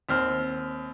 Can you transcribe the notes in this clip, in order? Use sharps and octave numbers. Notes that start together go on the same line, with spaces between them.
D#2 C4 F6